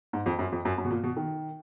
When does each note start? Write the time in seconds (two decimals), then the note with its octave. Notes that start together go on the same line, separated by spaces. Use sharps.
0.13 G#2
0.26 F2
0.39 F#2
0.52 F2
0.65 F#2
0.78 F#2
0.85 B2
0.90 A#2
1.04 B2
1.17 D#3